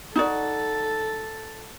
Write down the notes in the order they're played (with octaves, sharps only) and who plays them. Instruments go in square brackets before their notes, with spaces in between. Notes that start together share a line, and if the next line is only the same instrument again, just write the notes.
[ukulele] D#4 F#4 D5 [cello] A4